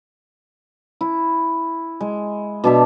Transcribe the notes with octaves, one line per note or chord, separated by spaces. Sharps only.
E4
G#3
B2 D4 E5